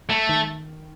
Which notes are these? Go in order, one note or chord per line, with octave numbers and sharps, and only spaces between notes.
A3
D#3